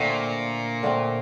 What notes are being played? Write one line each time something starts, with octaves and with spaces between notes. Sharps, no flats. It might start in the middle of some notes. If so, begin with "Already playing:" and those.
Already playing: A#2 D3 A3 C4
D3 A3 C4